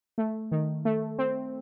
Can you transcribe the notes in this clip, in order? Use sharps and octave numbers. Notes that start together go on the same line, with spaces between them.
A3
D#3
A3
C4